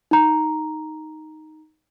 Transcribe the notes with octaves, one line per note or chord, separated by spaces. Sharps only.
D#4 A#5